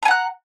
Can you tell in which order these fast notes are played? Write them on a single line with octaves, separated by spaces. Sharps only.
A#5 G#5 F#5 F#6